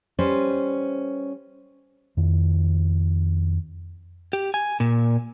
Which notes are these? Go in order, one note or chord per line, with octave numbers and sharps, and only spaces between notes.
G3 C#4 B4 C5
F2 D#3
G4
G#5
A#2